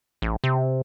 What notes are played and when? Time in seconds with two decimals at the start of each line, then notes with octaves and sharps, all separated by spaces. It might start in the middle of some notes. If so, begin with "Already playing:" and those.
0.22 A1
0.44 C3